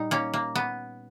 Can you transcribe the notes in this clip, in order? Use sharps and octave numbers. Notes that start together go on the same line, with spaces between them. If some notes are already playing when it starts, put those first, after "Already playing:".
Already playing: A#2 G3 D#4
A#3 C#4
A#3
B3